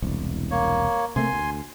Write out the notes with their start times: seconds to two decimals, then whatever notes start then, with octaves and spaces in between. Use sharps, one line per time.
0.02 E1 C2
0.51 A#3 C#5
1.16 C3 A3 A#3 G#5 C6
1.33 D2